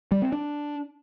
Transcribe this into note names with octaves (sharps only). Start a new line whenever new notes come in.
G3
C4
D4